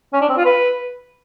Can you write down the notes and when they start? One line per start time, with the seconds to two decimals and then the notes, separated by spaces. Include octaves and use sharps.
0.13 C#4
0.21 D4
0.29 C4
0.37 F4
0.45 B4